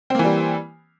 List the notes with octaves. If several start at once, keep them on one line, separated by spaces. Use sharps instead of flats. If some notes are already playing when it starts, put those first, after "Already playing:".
E3 G3 A#3 C4